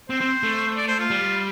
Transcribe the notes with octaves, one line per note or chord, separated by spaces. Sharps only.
C4 C5
C4
A3
D5
C5
F4
G3